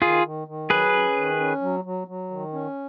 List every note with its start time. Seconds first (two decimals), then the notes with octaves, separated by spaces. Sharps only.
0.02 D#3 F4 G#4
0.24 D#3
0.48 D#3
0.70 F#3 G#4 B4
0.93 C#4
1.16 D#3
1.39 C#4
1.61 F#3
1.84 F#3
2.07 F#3
2.30 D#3
2.53 C#4